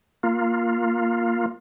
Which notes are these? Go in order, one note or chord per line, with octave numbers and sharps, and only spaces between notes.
A#3 F4